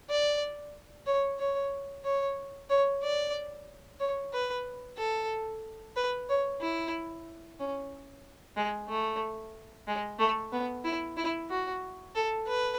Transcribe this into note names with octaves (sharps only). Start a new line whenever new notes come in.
D5
C#5
C#5
C#5
C#5
D5
C#5
B4
A4
B4
C#5
E4
C#4
G#3
A3
G#3
A3
B3
E4
E4
F#4
A4
B4